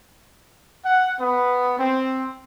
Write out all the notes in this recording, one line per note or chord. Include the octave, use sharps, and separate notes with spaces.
F#5
B3
C4